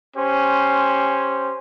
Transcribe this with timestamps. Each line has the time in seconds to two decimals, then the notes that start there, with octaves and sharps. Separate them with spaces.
0.16 C#4 G4 C5